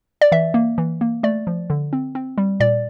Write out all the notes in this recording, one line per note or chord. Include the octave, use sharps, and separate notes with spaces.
D5
E3 E5
A#3
E3
A#3
A3 D5
F3
D3
C4
C4
G3
A#2 D5